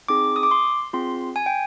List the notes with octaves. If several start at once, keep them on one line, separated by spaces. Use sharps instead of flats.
C4 D#4 G#4 D6
D#6
D6
C6
C4 F4 G#4 C6
G#5
G5